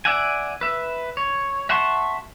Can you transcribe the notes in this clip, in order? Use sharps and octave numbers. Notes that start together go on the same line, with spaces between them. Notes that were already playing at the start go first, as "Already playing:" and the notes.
D5 E5 F#5 G#5
B4 E5
C#5
E5 F#5 A5 C6 C#6